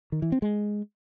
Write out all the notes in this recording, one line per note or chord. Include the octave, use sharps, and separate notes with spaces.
D#3
E3
C4
G#3